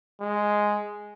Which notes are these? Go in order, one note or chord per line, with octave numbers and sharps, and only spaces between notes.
G#3